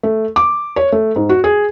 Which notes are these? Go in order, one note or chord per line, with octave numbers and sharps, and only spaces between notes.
A3
D6
C#5
A3
G#2
F#4
G#4